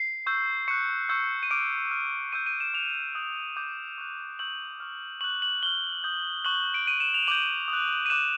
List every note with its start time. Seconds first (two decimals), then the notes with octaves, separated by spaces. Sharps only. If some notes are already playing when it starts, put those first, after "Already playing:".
Already playing: C7
0.26 C#6 E6 G6
0.68 C#6 F#6 C#7
1.09 C#6 E6 G6
1.43 D#7
1.51 D6 F6 D7
1.91 D6 F6
2.32 C#6 E6 G6 D#7
2.46 D#7
2.60 E7
2.74 D6 F#6 F7
3.15 D#6 G6
3.56 D6 G6
3.98 C#6 F#6
4.39 C#6 E6 G6 F#7
4.80 C#6 F6
5.21 C#6 F#6 F#7
5.42 F#7
5.63 C#6 F6 G7
6.04 D#6 G6
6.44 C#6 F#6 F#7
6.74 D7
6.86 C#6 F#6 D#7
7.00 E7
7.14 F7
7.27 D6 G6 F#7
7.68 D#6
7.73 F#6
8.06 D#7
8.10 D6 F#6 E7